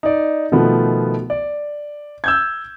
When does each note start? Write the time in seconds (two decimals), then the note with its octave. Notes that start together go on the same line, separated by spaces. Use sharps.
0.03 D#4 D5
0.52 B2 D#3 F3 A3 B3
1.30 D5
2.24 E6 G6 G#6